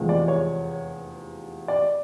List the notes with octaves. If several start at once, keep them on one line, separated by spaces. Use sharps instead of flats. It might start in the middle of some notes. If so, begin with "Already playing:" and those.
Already playing: F1 E2 C3 F3 G#3
D5
C#5
D5